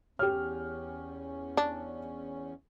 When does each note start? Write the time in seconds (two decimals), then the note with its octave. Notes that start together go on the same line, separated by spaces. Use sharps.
0.19 E2 C#4 G4 F6
1.57 D4